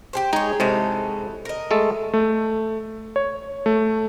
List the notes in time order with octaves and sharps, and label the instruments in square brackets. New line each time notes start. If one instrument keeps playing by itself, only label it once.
[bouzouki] G4 G#4 C5
[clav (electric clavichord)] G#3 D#4 D#5 [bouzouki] G#4 C#5
[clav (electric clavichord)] G#2 C3 G#3 [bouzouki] E3 A4 C#5
[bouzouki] A#4 D#5
[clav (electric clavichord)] G#3 A3 A4
[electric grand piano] A3
C#5
A3